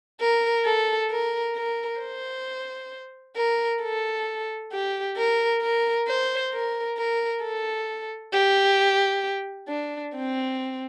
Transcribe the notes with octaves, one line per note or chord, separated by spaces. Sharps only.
A#4
A4
A#4
A#4
C5
A#4
A4
G4
A#4
A#4
C5
A#4
A#4
A4
G4
D4
C4